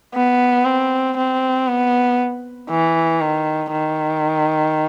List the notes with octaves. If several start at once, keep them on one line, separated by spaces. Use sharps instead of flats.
B3
C4
C4
B3
E3
D#3
D#3